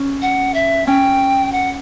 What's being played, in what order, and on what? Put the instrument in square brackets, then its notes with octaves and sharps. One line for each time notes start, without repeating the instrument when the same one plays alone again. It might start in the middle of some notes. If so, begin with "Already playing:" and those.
Already playing: [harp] C#4
[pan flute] F#5
E5
[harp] C#4 [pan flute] G5
[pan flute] F#5